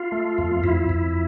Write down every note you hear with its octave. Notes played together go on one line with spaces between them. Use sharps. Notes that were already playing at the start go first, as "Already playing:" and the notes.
Already playing: F4
A3
F2
F2 E4
F2